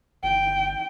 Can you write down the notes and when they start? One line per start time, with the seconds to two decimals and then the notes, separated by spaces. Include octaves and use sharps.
0.23 G1 G5